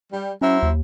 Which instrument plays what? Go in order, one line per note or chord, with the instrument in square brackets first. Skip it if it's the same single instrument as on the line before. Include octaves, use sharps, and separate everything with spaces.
[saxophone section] G3
[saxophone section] F#3 E4 C5 [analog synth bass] C#4
[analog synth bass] D#2